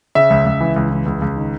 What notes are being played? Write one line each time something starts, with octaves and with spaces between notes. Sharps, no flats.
C#3 E5
C#2
C#2
E3
C#2
E3
C#2
C#2
D#3